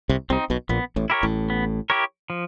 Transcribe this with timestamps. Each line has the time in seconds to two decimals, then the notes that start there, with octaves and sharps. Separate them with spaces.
0.09 C2 C3
0.30 C2 C3 C4 D#4
0.50 B1 B2
0.69 A#1 A#2 B3
0.96 A1 A2
1.10 E4 G4 A#4 C#5
1.23 A1 A2
1.50 B3
1.90 E4 G4 A#4 C#5
2.30 F3